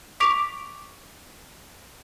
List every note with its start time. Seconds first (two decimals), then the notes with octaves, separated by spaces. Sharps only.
0.20 C#6 D6 B6 D7 F7